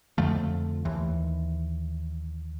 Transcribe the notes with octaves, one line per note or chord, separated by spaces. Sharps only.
F2 D3 F3 A3
D#2 E3